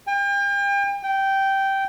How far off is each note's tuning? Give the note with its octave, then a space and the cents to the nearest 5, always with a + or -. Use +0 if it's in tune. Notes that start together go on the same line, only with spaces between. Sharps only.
G5 +40
G5 -10